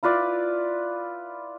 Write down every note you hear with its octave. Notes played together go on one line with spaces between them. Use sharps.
E4 F4 B4 D5